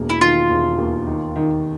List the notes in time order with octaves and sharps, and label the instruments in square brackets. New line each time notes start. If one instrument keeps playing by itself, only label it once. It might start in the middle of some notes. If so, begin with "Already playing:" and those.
Already playing: [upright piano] E1 A#3
[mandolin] E4
[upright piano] D#3 [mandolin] F4
[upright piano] E1
D#2
D#3
D#3